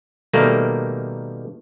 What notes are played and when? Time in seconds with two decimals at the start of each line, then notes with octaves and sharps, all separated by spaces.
0.33 B2 D#3 G3 A3 A#3